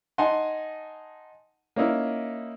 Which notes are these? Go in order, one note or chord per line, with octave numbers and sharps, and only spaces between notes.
D#4 D#5 F#5 G#5 A5 C6
A#3 C#4 D#4 E4 A#4